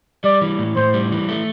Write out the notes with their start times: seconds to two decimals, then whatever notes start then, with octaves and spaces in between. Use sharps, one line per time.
0.24 G3 D5
0.41 E3
0.59 A2
0.76 A2 C5
0.94 G3
1.12 E3
1.29 A3